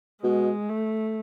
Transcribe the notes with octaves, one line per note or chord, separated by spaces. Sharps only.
B2 G#3
A3